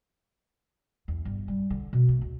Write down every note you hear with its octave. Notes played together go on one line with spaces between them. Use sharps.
E2
G1
G3
D3
B2
A3
D2